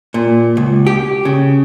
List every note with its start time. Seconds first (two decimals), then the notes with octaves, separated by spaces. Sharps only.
0.14 A#2
0.57 C#2
0.86 G4
1.25 C#3